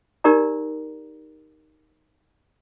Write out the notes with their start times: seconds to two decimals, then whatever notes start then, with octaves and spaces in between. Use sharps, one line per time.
0.24 D#4 G4 A#4 D5 A#5